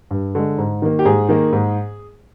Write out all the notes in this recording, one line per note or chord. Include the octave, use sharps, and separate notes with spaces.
G2
D3 G#3
G#2
D#3 A#3
G4
G#2 G#4
D#3 A#3
G#2